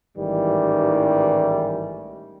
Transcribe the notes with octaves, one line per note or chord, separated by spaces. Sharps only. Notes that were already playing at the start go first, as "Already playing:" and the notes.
A1 G#2 D#3 E3 G3